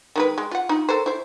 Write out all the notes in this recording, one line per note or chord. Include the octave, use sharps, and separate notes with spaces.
D#3 G#3 B4
G#3
F4 F#5
D#4 F4
A4 A#4 C5
E4 C5